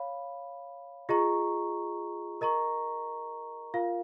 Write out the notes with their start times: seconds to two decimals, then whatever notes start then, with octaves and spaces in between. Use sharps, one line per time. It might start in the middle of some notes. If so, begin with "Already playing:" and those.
Already playing: C#5 F5 B5
1.09 F4 G#4 D#5 A#5 C#6
2.41 A#4 D#5 A#5 C#6
3.74 F4 A#4 F5